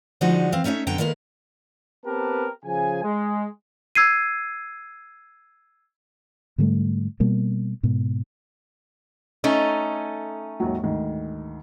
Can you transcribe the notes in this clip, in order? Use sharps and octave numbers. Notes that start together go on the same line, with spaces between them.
D3 F3 G3 G#3 D#4 F#4
E3 C4 F5
A3 C#4 D#4 C#5 E5
F#2 D3 B3 G5 A#5
D#3 G#3 A#3 A#4 B4
B3 C4 G4 A#4 B4 A5
C#3 F3 G#4 G#5
G#3
E6 G#6 C7 D#7
G#2 D3 G3 A3
B2 G3 A#3
G#2 B2
A3 C#4 D#4
D#2 G#2 F#3
D2 G#2 D#3